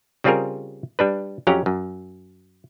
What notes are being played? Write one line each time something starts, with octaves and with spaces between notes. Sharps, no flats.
C#3 G3 C4 F4 G#4 A#4
G3 D4 B4
F2 F#3 C#4 G4 F5 A#5
F#2